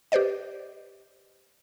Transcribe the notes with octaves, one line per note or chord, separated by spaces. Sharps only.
G4 B4 C5 D5 D#5